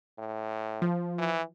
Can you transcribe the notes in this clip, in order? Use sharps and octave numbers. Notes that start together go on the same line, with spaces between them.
A2
F3
E3